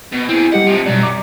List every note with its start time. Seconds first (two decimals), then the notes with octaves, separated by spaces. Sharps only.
0.13 B2
0.29 C4 E4 G#4
0.52 G3 G4 D#5 F#5
0.67 C3 F3
0.86 F#2 B2 G3 D5
1.03 D6